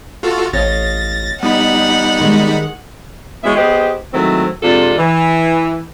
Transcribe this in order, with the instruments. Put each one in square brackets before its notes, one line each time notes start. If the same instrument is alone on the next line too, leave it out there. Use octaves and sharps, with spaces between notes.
[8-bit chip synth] F4 F#4 A4
[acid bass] A1 [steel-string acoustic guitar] C#5 D#5 F5 [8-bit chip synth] A6 A#6
[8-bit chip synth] G3 D#4 B5 [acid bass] B3 [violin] F#5
[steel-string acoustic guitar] D#3 G#3
[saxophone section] E3 G#3 B3 C#4 F#4 E5
B3 G4 G#4 B4 C5 D#5
D#3 F#3 G#3 A3 C4 E4
F2 C3 G#3 D4 F4 A4
E3